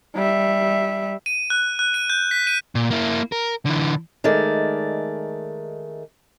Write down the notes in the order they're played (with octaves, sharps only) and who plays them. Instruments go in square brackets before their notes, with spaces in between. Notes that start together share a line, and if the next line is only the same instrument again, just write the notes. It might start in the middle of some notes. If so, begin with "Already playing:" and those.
[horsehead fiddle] G3 E5
[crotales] D#7
F#6
F#6
D#7
G6
B6
D#7
[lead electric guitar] A#2
A#3 E4
A#4
D3 E3
[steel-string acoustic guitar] D#3 G#3 A3 D5